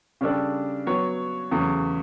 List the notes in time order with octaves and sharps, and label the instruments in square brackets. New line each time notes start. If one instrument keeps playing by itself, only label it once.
[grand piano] C#3 G3 D4 A4 D5
F#3 B3 F#4 C#5
E2 C#3 F#3 A3